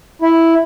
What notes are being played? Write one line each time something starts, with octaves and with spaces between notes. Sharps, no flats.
E4